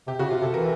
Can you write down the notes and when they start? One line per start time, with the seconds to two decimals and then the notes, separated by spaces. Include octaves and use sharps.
0.07 C3 G4
0.19 C#3 F#4
0.30 C3 F4
0.41 C3 A4
0.54 E3 A#4